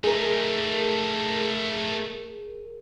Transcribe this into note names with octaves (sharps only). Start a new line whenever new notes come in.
A3 D#4 G#4 A#4